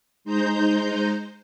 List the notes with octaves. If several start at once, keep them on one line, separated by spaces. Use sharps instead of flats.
G#3 D#4 C5 A#5 G6